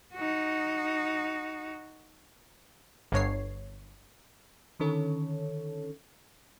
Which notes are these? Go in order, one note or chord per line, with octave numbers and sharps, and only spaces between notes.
D#4 F#4
G1 G2 C#5 C7
D3 D#3 C#4 A4 C#5